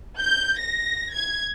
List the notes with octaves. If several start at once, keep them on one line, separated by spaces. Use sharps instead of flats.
G6
A#6
G#6